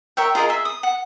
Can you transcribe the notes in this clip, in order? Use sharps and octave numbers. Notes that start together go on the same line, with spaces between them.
A#4 C#5 E5 G5
F4 G#4 A#4 D#5
G#4 E5
D#6
F#5